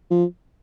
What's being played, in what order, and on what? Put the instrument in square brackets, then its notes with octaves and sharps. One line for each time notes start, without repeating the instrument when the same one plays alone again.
[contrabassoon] F3